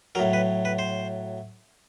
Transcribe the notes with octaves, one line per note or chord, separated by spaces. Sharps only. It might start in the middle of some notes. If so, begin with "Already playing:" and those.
A2 F#3 A#4
B4
B4
C5